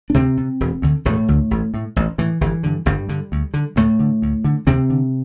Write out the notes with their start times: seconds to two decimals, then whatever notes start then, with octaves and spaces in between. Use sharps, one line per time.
0.10 D4
0.14 D2 C3 C4
0.37 C3
0.60 E1
0.82 D2 D3
1.05 E1 A2 A3
1.28 D2 D3
1.51 A1
1.74 A2
1.96 A1
2.18 A2 E3
2.41 G1 E3
2.63 G2 D3
2.86 G1 G2 G3
3.09 G2 D3
3.32 D2
3.54 D3
3.76 D2 A2 A3
3.99 D3
4.22 D2
4.44 D3
4.67 D2 C3 C4
4.90 D3